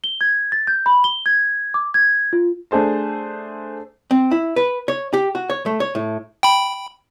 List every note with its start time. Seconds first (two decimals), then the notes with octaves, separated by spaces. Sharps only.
0.04 G7
0.21 G#6
0.52 A6
0.67 G6
0.86 B5
1.04 G7
1.26 G#6
1.74 D6
1.94 G#6
2.33 F4
2.71 A3 D4 G#4 C5 A5
4.11 C4
4.31 E4
4.56 B4
4.88 C#5
5.13 G4
5.35 F#4
5.50 C#5
5.66 A3
5.80 C#5
5.95 A2
6.43 G5 B5